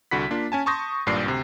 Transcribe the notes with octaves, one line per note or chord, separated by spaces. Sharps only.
C2 D3 F#4 F#5 B5 B6
A#3 D4 F4
C#4 G#5 A5
A5 C6 C#6 D#6 G6 A#6
G#1 G2 A#2 D5 C7
D2 C3